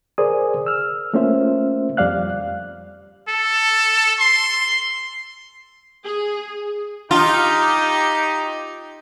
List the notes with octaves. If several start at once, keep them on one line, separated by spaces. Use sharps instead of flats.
G#4 A#4 C5 D5 G#5 D#6
E6 F6
A3 A#3 C#4 F4 C5 E5
F2 G3 D5 F5 F#6
A4
C6
G#4
D#4 F4 G4